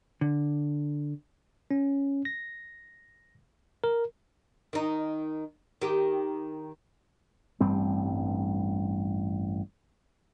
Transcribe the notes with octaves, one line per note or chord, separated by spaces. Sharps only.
D3
C#4
A#6
A#4
D#3 D#4
D#3 G4
A1 G2 G3 C4